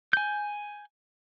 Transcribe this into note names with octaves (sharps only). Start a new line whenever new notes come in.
G#5 G6